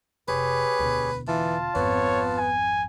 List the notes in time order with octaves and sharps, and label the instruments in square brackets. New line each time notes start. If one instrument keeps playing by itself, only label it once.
[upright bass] F1 [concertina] G4 G#4 C#5 [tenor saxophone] B4
[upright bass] E1 D2
[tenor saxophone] E3 [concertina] F4 A5
[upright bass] G#1 F2 [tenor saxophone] B3 [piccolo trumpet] C#5
[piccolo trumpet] G#5